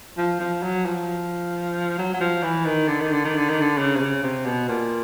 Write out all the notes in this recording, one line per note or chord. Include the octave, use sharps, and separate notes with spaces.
F3
F3
F#3
F3
F#3
F#3
F3
E3
D#3
D3
D#3
D3
D#3
D3
D#3
D3
C#3
C3
C#3
C3
B2
A#2